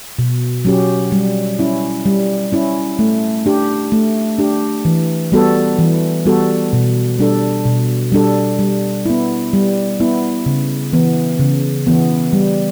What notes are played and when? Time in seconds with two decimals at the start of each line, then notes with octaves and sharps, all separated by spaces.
0.19 B2
0.65 F#3 C#4 G4
1.12 G3
1.59 C#4 E4
2.05 G3
2.52 C#4 E4
2.99 A3
3.46 D4 G4
3.92 A3
4.39 D4 G4
4.85 E3
5.32 G3 B3 F#4 A4
5.79 E3
6.25 G3 B3 F#4 A4
6.73 B2
7.19 G3 D4 A4
7.65 B2
8.12 G3 D4 A4
8.59 G3
9.06 B3 E4
9.53 G3
10.00 B3 E4
10.46 C#3
10.93 E3 B3
11.40 C#3
11.87 E3 B3
12.33 G3